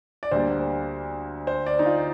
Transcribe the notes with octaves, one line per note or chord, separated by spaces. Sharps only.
D5
D2 D3 G3 A#3 C5
C5
D5
D#4
F4